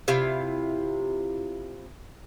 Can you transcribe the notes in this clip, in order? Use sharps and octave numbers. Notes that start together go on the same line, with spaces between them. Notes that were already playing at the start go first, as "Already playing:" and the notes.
C3 E4 F4 F5